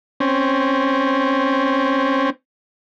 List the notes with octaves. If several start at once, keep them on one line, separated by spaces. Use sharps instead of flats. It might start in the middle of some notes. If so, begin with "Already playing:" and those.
C4 C#4